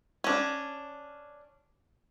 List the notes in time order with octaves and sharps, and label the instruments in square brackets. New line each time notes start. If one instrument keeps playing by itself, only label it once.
[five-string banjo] C#4 D4